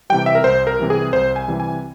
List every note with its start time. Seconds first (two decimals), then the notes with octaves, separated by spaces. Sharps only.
0.10 C3 E3 G3 G5
0.26 E5
0.35 A#4
0.44 C2 C5
0.67 A#4
0.79 C3 E3 G3
0.90 G#4
1.13 C2 C5
1.36 G#5
1.48 C3 E3 G3
1.60 G#5